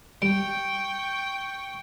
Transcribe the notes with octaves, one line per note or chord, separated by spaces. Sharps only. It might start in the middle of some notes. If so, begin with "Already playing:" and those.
G3 G5 C#6 D7